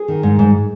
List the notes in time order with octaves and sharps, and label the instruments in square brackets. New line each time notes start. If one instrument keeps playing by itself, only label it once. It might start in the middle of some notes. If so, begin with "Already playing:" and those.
Already playing: [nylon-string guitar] G#4
D#3
G#2
G#2